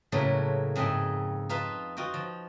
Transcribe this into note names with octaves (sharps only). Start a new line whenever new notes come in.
A2 C#3 F#3 A3 A#3 B4
F2 G#2 G#4 D#5 E5 G5
D#4 F4 B4 F5 A5
F4 F#4 D#5 G5
F3